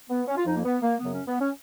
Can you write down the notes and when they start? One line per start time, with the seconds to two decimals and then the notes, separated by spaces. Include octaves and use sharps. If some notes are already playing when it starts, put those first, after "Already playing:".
0.10 B3
0.28 C#4
0.37 F4
0.46 F2 F3 D#4
0.56 A#3
0.64 B3
0.82 A#3
1.00 F#2 C#3 F#3 B3
1.14 C#4
1.27 B3
1.41 C#4